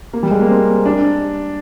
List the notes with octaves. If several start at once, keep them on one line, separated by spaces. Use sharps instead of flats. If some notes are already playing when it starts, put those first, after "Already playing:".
A#3
G3
G#3
A#3
C4
D4